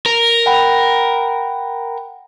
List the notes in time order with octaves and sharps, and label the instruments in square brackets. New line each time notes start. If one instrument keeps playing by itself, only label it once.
[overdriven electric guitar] A#4
[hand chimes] F#5 G5 B5